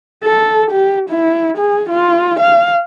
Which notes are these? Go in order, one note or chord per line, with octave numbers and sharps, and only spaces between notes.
A4
G4
E4
G#4
F4
F5